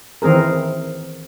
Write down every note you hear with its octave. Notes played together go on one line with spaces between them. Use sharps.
D#3 E3 C4 G#4 A#4